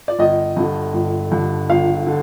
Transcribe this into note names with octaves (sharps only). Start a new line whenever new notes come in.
D5
G1 D#5
G2 D3
G1
G2 D3
G1 F5
D3